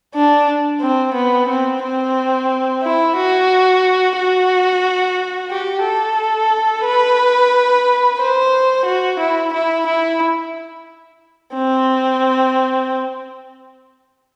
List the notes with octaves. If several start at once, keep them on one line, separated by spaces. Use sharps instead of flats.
D4
C4
B3
C4
C4
E4
F#4
F#4
G4
A4
B4
C5
F#4
E4
E4
E4
C4